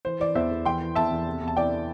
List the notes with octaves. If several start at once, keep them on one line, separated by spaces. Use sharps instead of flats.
E3 C5
E3 D5
E2 C5 E5
E2
E3 G5 C6
E3
E2 E5 A5
E2
C3
E2
A5
E3 D5 G5